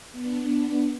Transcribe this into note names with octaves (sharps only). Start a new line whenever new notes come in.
B3 D4